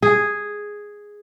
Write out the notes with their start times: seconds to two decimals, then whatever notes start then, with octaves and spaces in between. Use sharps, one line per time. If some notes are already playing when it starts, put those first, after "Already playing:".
0.02 G#4